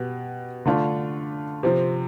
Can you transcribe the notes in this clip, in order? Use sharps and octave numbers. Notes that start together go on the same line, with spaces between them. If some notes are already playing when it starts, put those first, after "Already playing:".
Already playing: B2 B3 G4
D3 A3 D4 F4
C3 F3 C4